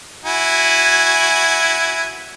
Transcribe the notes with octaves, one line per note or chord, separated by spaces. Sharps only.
E4 F#4 G#5